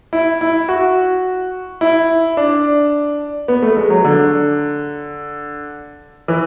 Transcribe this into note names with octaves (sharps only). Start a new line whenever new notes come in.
E4
E4
F#4
E4
D4
B3
A3
G#3
F#3
D3
E3